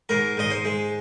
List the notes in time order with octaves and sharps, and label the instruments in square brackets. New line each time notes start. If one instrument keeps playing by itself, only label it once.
[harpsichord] G#2 A#4
G#2 D#5
C5
G#3